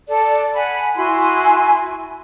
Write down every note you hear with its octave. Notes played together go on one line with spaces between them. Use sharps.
A4 D5
F#5 G#5 B5
E4 F#4 G#5 C6